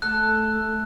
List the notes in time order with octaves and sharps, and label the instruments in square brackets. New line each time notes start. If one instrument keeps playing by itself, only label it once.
[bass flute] A3 [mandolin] A4 [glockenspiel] F#6